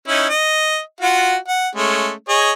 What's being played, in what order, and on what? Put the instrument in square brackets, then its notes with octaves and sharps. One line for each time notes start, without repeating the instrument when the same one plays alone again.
[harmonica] C#4 D#4 E4
D#5
F4 F#4 F#5
F#5
G#3 A3 C#4
G#4 C#5 D#5